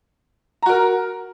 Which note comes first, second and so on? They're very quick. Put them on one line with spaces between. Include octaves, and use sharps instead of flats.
A#5 F#4 A#4